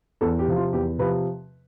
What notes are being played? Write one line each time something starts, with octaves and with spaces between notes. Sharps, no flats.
E2 A4
G4
C3 F3
F4
E2 G4
C3 F3 B4